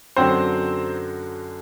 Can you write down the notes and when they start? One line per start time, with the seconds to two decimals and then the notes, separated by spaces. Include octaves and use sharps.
0.16 F#2 D3 F#3 C4 C5